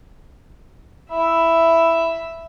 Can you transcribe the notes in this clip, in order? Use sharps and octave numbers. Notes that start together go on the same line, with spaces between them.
E4 E5